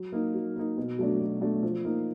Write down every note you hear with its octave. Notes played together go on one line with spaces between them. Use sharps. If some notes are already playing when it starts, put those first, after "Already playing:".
Already playing: F#3
A#3 D#4
F#3
A#3 D#4
B2
F#3 A3 D4
B2
F#3 A3 D4
F3
A#3 D#4